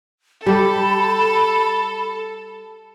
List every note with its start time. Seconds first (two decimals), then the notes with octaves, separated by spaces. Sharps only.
0.46 G3 G4 A4 B5